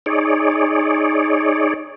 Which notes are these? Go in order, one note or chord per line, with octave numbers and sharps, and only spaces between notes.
D#4 G#4 C#5 D5